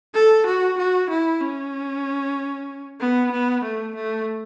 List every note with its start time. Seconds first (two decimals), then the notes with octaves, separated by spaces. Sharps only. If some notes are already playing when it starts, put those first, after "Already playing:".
0.14 A4
0.46 F#4
0.78 F#4
1.10 E4
1.41 C#4
3.00 B3
3.32 B3
3.64 A3
3.95 A3